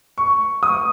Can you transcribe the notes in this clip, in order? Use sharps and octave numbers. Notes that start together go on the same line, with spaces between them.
C#6
D#6